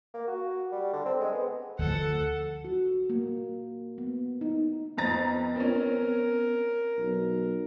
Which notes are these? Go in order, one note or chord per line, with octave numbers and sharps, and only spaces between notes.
A#3
F#4
G3
D3
C4
G#3
B3
D2 D3 F3 A4 F#5
F#4
A#3
B3
D#4
F2 B3 A#5 A6
C4 C#4 A#4
B1